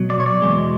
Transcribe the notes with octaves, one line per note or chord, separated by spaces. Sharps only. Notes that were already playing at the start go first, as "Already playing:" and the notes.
Already playing: B2 F#3
D5
C#5
D5
E2 B2 G#3